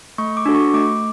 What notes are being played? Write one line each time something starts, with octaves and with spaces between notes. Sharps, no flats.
A3 C#6
D6
D4 F#4 A4
C#6
A3 D6